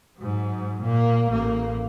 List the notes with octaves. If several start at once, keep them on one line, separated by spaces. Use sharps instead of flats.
G#2 F#3
A#2 A#3
A1 A#3